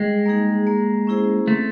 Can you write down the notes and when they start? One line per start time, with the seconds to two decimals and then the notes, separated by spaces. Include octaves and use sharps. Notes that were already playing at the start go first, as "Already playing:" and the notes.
Already playing: G3 G#3
0.26 A#3 D#4 G#4
0.67 A#3
1.07 C#4 E4 G#4 C5
1.48 A3 C4